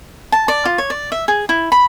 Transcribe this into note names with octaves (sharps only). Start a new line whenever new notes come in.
A5
D5
F4
C#5
D5
E5
G#4
E4
B5